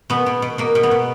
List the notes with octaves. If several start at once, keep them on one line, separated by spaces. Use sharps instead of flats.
B2 B3
B2
B2
B2 A#3
B2
B3
B2